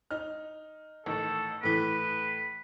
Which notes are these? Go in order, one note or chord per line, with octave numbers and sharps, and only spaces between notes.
D#4 F6
A1 D#3 A3 A4
A2 E3 B4